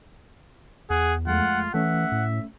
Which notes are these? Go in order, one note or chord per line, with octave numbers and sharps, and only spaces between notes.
E2 G#4 F#5
F2 G#3 A3 F4 F#5
E3 A3 C#4 E5 F#5
A2